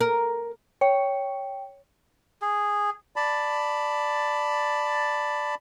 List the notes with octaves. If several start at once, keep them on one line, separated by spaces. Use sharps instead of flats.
A#4
C#5 G5
G#4
D5 A5 B5